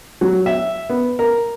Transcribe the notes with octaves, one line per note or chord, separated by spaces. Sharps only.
F#3
E5
B3
A#4